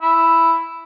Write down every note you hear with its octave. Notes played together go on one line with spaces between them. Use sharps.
E4